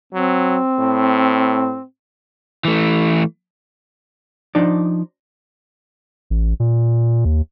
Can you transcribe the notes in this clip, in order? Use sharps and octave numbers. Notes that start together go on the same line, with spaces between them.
F#3 C4
A2
E3 A3
F3 D4 D#4 D5
A1
A#2
D#2